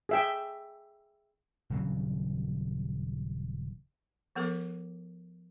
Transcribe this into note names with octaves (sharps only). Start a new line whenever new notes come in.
G#4 E5 G5
D#1 C#3 F#3 C4
F3 B3 A4 A#4 D6